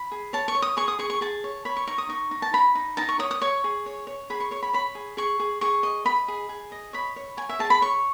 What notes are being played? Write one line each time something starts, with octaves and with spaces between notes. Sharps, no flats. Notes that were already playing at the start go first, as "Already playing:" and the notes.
Already playing: B5
G#4
C#5 A5
C#6
C#5
D#6
G#4 C#6
D#6
G#4 C#6
C#6
G#4 A5
C#5
C#5 B5
C#6
D#4 C#6
D#6
D#4 C#6
D#4
A5
D#4 B5
D#4
D#4 A5
C#6
C#5 D#6
D#6
C#5 C#6
G#4
C#5
C#5
G#4 B5
C#6
C#5 C#6
B5
C#5 B5
G#4
G#4 C#6
G#4
G#4 C#6
D#5
D#5 B5
G#4
G#4
D#5
C#5 B5
C#5
C#5 G#5
E5
G#4 A5
B5
C#5 C#6